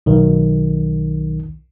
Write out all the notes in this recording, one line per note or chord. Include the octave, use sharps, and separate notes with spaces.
B1 D#3